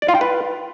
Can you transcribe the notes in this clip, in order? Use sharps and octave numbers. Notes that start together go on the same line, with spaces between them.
D5
F4
G5
B4